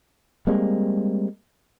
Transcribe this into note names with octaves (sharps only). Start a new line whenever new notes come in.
G3 G#3 A#3 C4